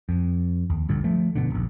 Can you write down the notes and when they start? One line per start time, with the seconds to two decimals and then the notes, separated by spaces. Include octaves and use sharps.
0.09 F2
0.70 D#2
0.89 A#1 G2 D3
1.04 F3 A3
1.36 G1 B2 D3
1.50 D#1 A#1